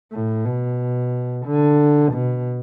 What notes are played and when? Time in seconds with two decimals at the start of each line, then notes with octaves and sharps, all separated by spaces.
0.12 A2
0.45 B2
1.46 D3
2.13 B2